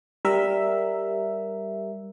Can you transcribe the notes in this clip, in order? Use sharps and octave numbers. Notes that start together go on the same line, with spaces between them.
G3 A#4 E5